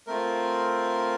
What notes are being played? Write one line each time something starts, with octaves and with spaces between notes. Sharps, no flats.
A3 C4 F4 A#4